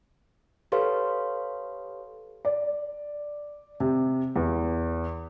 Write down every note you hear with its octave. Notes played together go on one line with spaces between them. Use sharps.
G4 A4 B4 C#5 F5 C6
D5
C3
E2